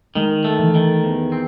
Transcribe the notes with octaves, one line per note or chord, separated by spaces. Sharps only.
D#3 G#3
A3
E3
D#3
E2
C4